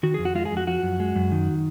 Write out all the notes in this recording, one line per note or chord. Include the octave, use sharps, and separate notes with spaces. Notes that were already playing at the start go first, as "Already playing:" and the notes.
D#3 F#4
F2 G#4
F#4
G#3 F4
G#4
F2
F#4
F3 F#4
F#2
G#3
F#2
D#3